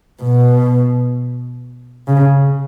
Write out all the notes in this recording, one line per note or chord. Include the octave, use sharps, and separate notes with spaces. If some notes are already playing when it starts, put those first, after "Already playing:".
B2
C#3